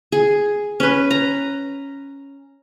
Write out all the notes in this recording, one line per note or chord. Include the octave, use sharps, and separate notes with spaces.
G#4
C#4 B4
A#5